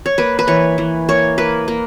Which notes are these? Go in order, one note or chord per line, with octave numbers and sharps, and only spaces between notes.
C#5
A#3 B4
B4
E3 C#5
E3
A#3 C#5
A#3 B4
A#3